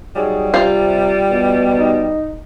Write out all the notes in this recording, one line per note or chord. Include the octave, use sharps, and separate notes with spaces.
F#3 G3 D#4 G#4
C3 F4 C5 F5
G2 B2
D#4